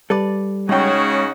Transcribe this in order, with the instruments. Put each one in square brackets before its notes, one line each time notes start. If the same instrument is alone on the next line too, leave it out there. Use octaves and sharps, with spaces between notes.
[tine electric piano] G3 [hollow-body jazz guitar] A4 B4 D5
[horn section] C#3 D#4 F#4 [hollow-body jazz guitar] G#3 G5 [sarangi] C#4